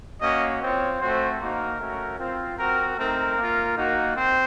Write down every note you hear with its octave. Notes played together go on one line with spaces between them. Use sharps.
A#3 C#4 F#4 D#5
C4 F4 C#5
A3 C4 F#4 C5
A#3 D#4 F#4 A#4
A3 C#4 F#4
C4 F4
C4 F#4 A#4
A3 C4 D#4 A#4
A#3 F4
A#3 D#4 F#4
C4 C5